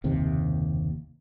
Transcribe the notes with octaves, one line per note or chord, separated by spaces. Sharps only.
F#1 D#2 C3